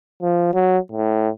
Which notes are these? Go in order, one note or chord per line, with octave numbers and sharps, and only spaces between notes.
F3
F#3
A2